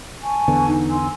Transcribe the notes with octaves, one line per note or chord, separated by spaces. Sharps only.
G#5 A5 C#6
E2 D3 B3
D#4
G#5 C6 E6